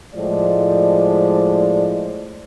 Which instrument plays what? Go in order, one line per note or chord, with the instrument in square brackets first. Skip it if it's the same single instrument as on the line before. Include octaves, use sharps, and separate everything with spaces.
[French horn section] A2 F3 G#3 D5